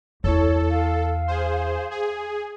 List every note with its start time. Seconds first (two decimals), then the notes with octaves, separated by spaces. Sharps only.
0.24 E2 E4 A4 C#5
0.70 F5
1.28 G#4 C5
1.91 G#4